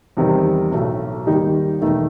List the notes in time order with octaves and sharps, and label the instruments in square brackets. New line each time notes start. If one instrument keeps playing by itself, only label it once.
[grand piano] E2 C3 D#3 G3
B1 A2 F#3 A3
D#2 D#3 G3 D#4 G4
E1 E2 D#3 A3 D#4